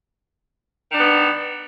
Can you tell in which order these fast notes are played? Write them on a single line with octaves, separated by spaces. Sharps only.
D#3 D4 B3